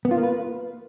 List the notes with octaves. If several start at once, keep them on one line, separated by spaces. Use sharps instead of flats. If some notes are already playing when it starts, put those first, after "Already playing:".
B3
F4
A#3
B4